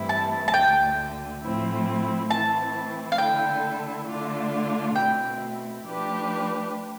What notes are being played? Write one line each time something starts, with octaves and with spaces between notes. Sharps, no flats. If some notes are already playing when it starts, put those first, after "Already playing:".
Already playing: G2 E3 A3 C4 E4
A5
A5
D2 D3 A3 G5
A2 F3 A3 C4 E4
E3 A3 C4 E4 A5
F5
D3 A3 E4 A4 G5
D3 A3 D4 F4
B2 A3 C4 E4 G5
F3 A3 D4 G4 B4